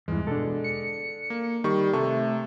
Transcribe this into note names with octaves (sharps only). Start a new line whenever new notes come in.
E2 G2 E3 G#3
B2 D4 A4
C#7
A#3
D#3 G3 C#6
C3 A3 C#6